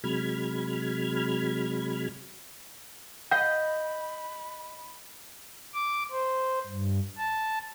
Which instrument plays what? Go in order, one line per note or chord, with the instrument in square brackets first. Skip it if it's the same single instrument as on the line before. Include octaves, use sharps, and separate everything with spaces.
[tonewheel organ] C3 F#3 G#3 B5 F6 G#6
[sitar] D#5 [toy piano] F5 F#5 [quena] B5 [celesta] G6
[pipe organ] D6
C5
G2
A5